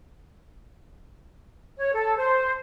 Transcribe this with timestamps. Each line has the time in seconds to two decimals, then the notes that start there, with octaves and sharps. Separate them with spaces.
1.77 C#5
1.93 A4
2.17 C5